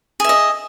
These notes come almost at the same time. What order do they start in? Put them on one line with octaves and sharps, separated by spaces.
G#4 E5 D#5